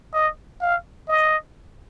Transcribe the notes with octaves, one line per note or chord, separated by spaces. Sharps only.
D#5
F5
D#5